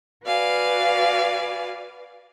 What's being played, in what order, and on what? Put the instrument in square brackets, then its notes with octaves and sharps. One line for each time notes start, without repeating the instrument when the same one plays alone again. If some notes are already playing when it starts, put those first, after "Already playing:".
[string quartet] F#4 B4 D5 F5 G#5